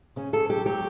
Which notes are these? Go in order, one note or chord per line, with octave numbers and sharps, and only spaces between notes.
C#3 C#4
C#3 A4
F#3 G4
F#3 G4